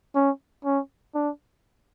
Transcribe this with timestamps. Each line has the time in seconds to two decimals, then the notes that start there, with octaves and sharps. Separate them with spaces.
0.15 C#4
0.65 C#4
1.15 D4